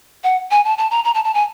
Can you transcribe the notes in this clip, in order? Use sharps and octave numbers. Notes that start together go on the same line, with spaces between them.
F#5
G#5
A5
A5
A#5
A#5
A5
A5
G#5